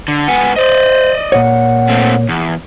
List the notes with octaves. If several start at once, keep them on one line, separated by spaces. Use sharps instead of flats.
D3
G#2 B4 F#5 G#5
C5 D5 D#5
A#2 C#5 F#5
A3 C4
E2